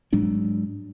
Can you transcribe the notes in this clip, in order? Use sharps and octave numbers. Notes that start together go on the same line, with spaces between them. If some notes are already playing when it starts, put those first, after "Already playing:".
G#2 F#3 G#3 D4